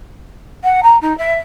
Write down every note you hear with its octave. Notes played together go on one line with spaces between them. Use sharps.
F#5
A#5
D#4
E5